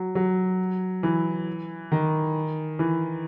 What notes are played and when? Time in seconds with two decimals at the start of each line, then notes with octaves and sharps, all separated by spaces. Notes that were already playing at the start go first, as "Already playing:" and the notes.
Already playing: F#3
0.15 F#3
1.03 E3
1.92 D#3
2.79 E3